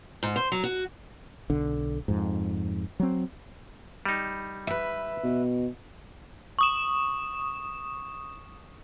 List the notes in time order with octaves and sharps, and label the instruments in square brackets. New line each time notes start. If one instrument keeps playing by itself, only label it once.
[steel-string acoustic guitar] G#2
C5
F#3
F#4
[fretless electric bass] B1 D3
F2 G#2
F#3 C4
[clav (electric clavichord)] G3 D#4
[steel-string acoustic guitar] B4 E5
[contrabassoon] B2
[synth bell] C#6 D#6 E7